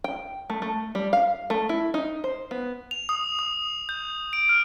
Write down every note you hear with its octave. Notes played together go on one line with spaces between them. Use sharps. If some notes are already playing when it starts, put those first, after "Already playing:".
G5
A3
A3
G3
F5
A3
E4
D#4
C5
B3
F7
D#6
D#6
G6
D7
F6